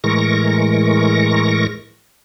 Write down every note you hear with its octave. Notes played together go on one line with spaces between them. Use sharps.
A2 E3 G#3 A#4 C#6 A#6